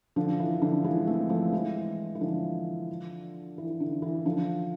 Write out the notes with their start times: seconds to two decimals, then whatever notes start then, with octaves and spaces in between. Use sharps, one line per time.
0.16 D3 F3
0.39 E3
0.62 D3 F3
0.84 E3 G#3
1.07 A3 C4
1.29 F3 A3
1.52 E3 G#3
2.15 E3
2.21 D3 F3
3.58 E3
3.80 D3
4.02 E3
4.25 D3 F3